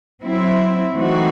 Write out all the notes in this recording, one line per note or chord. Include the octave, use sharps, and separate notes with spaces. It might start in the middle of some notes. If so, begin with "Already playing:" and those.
F#3 C4 E4
E3 A3 C4 D#4 F#4